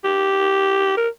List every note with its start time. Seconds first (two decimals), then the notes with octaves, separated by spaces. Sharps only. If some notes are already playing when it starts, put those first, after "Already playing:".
0.04 G4
0.97 A#4